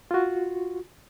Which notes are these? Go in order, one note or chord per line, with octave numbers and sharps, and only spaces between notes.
F4 F#4